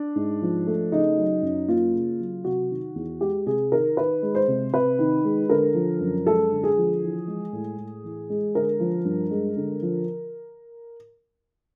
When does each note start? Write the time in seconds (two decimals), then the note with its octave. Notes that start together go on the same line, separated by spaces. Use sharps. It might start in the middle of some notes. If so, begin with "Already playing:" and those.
Already playing: D4
0.16 G#2
0.42 F3
0.67 A3
0.92 C#3 D#4
1.17 F#3
1.42 F#2
1.68 A#3 F4
1.94 C#3
2.19 F#3
2.44 C3 F#4
2.70 D#3
2.95 E2
3.21 G#3 G4
3.47 C3 G#4
3.72 D#3 A#4
3.97 D#3 B4
4.22 G#3
4.35 C5
4.48 C3
4.74 C3 B4
4.99 D#3
5.24 G#3
5.49 D3 A#4
5.74 F3
6.00 F#2
6.26 G#3 A4
6.51 D3
6.63 G#4
6.77 F3
7.02 E3
7.27 G#3
7.53 A2
7.78 A2
8.04 E3
8.30 G#3
8.55 D3 A#4
8.80 F3
9.05 G2
9.31 G#3
9.56 D3
9.82 F3